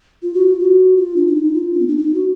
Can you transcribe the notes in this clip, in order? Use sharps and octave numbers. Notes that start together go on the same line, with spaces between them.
F4
F#4
F4
F#4
F4
D4
D4
D#4
F4
D4
B3
D4
D#4
F#4